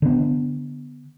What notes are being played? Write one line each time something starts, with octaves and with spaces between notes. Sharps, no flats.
D3 B3